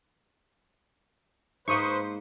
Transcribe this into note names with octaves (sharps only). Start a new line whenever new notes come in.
G#2 A#3 B4 C5 C#6 D#6 G6